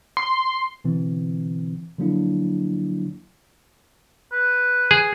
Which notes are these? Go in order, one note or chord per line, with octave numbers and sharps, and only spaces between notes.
C6
B2 D3 E3 C4
D3 F3 F#3 A#3 D4 E4
B4
G#4